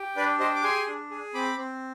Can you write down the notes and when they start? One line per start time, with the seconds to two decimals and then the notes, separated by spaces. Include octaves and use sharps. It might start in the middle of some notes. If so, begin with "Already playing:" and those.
Already playing: G4
0.16 D4 B4 D5
0.40 G4 C5 D#5
0.56 D6
0.63 G#4 G#5 C6
0.87 D4
1.11 G#4
1.34 C4 B5 D6
1.58 C4